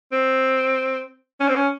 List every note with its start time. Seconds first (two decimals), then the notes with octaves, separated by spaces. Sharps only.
0.12 C4
1.41 C#4
1.49 C4
1.56 C#4